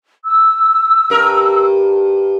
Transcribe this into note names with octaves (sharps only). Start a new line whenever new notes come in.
E6
G2 A#4